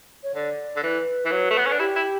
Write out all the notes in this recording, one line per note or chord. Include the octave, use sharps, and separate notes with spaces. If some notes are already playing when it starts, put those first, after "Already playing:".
C#5
D3 D5
D3
E3 B4
E3
F#3
A3
B3
C#4
D4
E4 G4
E4